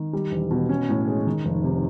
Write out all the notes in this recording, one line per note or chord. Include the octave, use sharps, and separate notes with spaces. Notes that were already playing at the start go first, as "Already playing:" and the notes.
Already playing: D#3
G3
E1
B2
C#4
A2
G#3
D#3
F1
C3